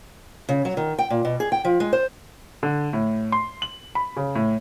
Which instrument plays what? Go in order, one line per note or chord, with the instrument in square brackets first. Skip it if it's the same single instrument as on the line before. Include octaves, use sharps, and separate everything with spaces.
[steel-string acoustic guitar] C#3
F#3
D#3
G5
A#2
B2
G#4
G5
F3
G#3
C5
[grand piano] D3
A2
C6
F#7
B5
C#3
A2